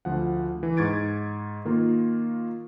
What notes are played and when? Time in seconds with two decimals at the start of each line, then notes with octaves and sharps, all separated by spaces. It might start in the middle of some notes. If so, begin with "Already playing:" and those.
0.05 D2 F3 F#5
0.63 E3
0.77 G#2 C#6 G#6 A6 D7
1.65 D#3 A#3 F4 A#4